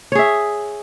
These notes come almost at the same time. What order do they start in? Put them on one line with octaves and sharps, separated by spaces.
C#5 G#4 E5